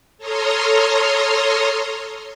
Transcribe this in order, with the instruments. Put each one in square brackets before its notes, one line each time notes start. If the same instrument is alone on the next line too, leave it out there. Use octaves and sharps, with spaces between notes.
[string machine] A4 C#5 A#5 C6 D#6 F6